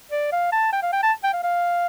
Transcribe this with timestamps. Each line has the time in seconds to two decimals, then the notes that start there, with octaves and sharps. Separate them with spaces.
0.11 D5
0.32 F5
0.52 A5
0.73 G5
0.83 F5
0.93 G5
1.03 A5
1.23 G5
1.33 F5
1.44 F5